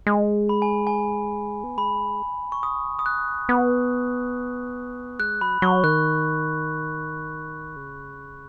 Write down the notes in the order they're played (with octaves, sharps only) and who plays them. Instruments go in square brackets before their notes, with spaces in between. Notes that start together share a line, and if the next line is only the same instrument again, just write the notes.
[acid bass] G#3
[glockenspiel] B5
G#5
G#5
[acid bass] B3
[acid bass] G#3 [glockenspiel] B5
[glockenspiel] C#6
D#6
D#6
F#6
[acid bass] B3
[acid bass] G#3 [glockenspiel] F#6
[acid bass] F#3 [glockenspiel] B5
[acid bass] F#3 [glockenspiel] C#6
[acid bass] D#3 [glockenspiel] F#6
[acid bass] C#3